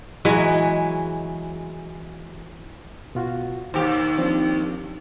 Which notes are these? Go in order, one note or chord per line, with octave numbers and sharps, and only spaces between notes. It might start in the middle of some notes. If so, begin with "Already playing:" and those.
E3 F#3 G#3
B2 F4 F#4
D#2 G4 C5
F3 C4 D4